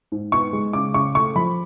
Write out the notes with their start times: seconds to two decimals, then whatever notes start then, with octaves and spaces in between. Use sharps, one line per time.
0.12 G#2
0.32 B3 C#6
0.53 G#3
0.73 C#3 D6
0.94 C#3 C#6
1.15 A3 C#6
1.35 F3 B5